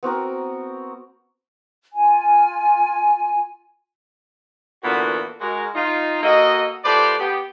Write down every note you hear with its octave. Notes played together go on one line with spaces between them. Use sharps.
B3 C4 F#4 A#4
F4 G#5
A#2 D3 E3 B3 F#4
G#3 F#4 A#4
D#4 F4
A#3 F#4 A4 D#5
A3 F4 G4 B4 C5 D5
B3 G4